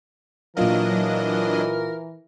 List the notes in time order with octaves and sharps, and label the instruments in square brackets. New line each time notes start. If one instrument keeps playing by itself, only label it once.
[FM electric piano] A#2 F4 F5 [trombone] E3 [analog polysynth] F#3 D4 D#5 [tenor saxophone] A#4